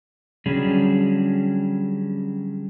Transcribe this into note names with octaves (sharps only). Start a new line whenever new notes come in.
D3 F#3 G3 C#4 D4 G#4